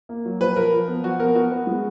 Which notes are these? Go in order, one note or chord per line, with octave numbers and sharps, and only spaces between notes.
A#3
F#3
F3 B4
F3 A#4
F3
B3
F3 F#4
B3 A#4
B3 F#4
B3
G#3